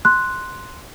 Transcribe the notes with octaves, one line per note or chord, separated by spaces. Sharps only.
C6 F#6